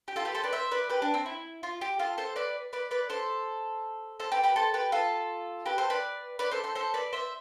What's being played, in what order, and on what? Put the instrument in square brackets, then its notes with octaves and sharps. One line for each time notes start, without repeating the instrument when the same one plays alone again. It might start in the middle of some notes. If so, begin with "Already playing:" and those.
[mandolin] G4
F4 A4
G4 B4
A4 C5
B4 D5
C5 E5
B4 D5
G4 B4
D4
C4
E4
F4
G4
F4 A4
A4 C5
B4 D5
B4 D5
B4 D5
A4 C5
A4 C5
G4 B4
G4 B4
A4 C5
G4 B4
F4 A4
G4 B4
A4 C5
B4 D5
B4 D5
A4 C5
A4 C5
A4 C5
B4 D5
C5 E5